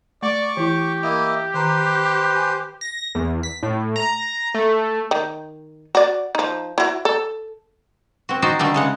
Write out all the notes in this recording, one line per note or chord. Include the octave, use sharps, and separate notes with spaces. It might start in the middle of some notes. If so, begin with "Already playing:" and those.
A3 D5 C#6 D6
E3 E4 G4
A#3 E4 D#5 D6
D#3 B4 C5 A#5
G#5
A#6
E2
B6
A2
A#5
A3
D#3
F#4 D5
F3 D#4
E4 F#4
A4
C4 F#4
D#4 F#4 C5 D5
D3 G3 A3 D#4
C#3 G#3 F#5